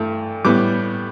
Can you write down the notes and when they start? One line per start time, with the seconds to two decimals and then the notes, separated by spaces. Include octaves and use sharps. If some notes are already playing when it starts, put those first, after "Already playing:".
Already playing: G2 E3 A3
0.45 A2 G3 B3 D6